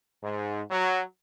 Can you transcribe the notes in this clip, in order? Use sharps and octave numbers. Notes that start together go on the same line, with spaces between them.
G#2
F#3